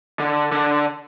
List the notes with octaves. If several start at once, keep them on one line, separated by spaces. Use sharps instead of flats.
D3
D3